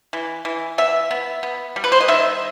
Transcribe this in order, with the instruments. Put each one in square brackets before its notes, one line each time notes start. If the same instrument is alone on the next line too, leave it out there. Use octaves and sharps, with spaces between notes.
[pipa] E3
E3
B3 E5
B3
B3
G3
B4
C5
D#5
D#3 E5